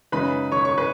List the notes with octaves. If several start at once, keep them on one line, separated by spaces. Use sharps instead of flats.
F#2 C#3 G#3 D#4 B4 B5
C#5 C#6
C#5 C#6
B4